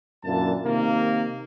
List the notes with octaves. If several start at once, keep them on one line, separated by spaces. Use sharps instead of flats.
F#2 A#2 D3 E3 A5
C3 D#3 A#3